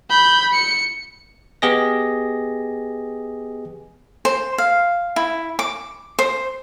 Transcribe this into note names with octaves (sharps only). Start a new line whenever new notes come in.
B5 G6
C#7
B3 G4 G#4 D#5 A#6
C5
F5
E4
D6
C5